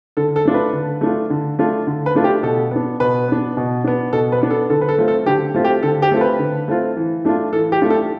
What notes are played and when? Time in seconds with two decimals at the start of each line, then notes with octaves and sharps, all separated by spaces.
0.17 D3 A4
0.36 A4
0.45 A3 D4 F4
0.54 B4
0.73 D3
1.01 A3 D4 F4
1.30 D3
1.59 A3 D4 F4
1.87 D3
2.06 B4
2.15 A3 D4 F4
2.24 G4
2.43 B2 A4
2.71 B3 D4
3.00 B2 B4
3.28 B3 D4
3.57 B2
3.84 B3 D4
4.13 B2 A4
4.32 B4
4.42 B3 D4
4.50 A4
4.70 D3 A4
4.81 B4
4.89 A4
4.98 A3 C4 F4
5.08 A4
5.26 D3 G4
5.54 A3 C4 F4
5.65 G4
5.83 D3 A4
6.02 G4
6.12 A3 C4 F4 A4
6.21 B4
6.39 D3
6.68 A3 C4 F4
6.97 E3
7.25 A3 D4 F4
7.53 E3 A4
7.72 G4
7.81 A3 D4 F4
7.90 A4